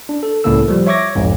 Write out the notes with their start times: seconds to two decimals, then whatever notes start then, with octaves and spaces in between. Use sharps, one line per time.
0.09 D4
0.23 A4
0.44 C#2 A2 C#3 A#3 A4 E6
0.68 F3 G3
0.86 C#5 E5 C#6 D6 G#6 A#6
1.15 B1 F2 G#2